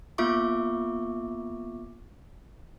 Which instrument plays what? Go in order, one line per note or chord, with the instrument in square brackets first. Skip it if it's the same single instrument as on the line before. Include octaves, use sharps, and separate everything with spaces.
[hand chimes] A#3 B3 F4 E5 C#6 D6